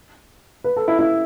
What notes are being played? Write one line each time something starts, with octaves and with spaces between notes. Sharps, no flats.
B4
A4
E4
E4